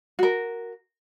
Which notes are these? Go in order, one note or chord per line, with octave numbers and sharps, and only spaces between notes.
F#4 A#4